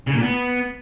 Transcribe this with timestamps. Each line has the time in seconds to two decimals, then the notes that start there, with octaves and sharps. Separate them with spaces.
0.07 C#3
0.15 A#2
0.22 B3